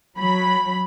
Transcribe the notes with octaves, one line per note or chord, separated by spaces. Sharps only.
F#3 B5